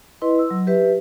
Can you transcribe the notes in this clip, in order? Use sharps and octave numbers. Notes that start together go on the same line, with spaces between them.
E4 B4 D#5 C6
E6
F#3
G4 B4 E5